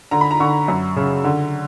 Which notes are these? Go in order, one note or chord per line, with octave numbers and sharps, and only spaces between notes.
D3 A#5
B5
A#5
D3 C#6
F#2
C#3
D3